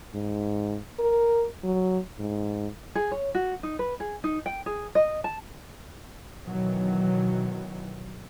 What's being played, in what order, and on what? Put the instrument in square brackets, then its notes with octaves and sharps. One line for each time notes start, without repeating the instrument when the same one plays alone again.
[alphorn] G#2
A#4
F#3
G#2
[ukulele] G#4
C#5
F#4
D#4
B4
G#4
D#4
G5
G#4
D#5
A5
[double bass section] B2 D#3 E3 F#3